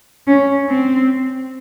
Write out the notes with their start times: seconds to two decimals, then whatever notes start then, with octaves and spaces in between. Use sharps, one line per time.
0.27 C#4
0.69 C4